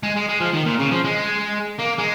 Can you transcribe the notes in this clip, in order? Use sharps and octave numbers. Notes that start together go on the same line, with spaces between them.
G#3
G#3
G#3
F3
D#3
A#2
C#3
F3
G#3
A#3
G#3